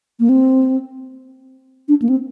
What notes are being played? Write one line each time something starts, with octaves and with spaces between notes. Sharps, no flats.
A#3
C4
D4
A#3
C4